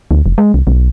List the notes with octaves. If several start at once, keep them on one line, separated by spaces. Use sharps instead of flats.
D2
F1
G#3
C2
B1